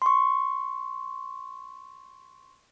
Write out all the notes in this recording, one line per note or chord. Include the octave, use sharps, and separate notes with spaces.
C6 C#6